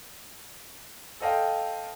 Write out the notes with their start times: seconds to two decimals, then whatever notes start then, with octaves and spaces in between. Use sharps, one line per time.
1.20 A4 C5 D#5 F5 G5